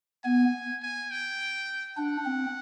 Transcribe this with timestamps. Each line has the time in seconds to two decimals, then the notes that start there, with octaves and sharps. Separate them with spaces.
0.24 B3 G#5
0.82 G#5
1.11 G5
1.97 D4 F#5
2.26 C4